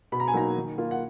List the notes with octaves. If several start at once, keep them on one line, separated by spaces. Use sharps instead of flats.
B2 B5
A#5
G#5
F#3 A#3 D#4 A#5
D#3
A#3 F4
F#5